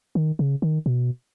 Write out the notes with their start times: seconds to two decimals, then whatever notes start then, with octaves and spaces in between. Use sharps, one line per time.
0.15 D#3
0.39 C#3
0.62 D#3
0.86 B2